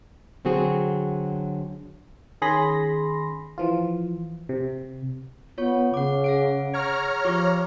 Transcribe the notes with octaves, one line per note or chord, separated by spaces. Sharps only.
D3 F#3 C4 F#4 G#4
D#3 C#4 G#4 B5 C6 A#6
E3 F3 F4
C3
B3 F4 C#5 C#6
C#3 F#5 D6
G#4 F#5 D7
C#5 A#5 F6
F3 F4 G4 D6